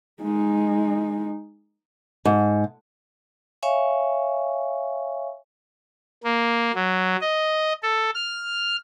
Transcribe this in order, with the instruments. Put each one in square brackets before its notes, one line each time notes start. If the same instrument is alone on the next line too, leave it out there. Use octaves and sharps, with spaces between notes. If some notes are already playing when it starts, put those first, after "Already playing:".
[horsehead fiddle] G#3 D#4
[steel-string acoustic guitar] G#2
[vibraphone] C#5 E5 F5 G#5 C#6
[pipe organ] A#3
F#3
D#5
A4
F6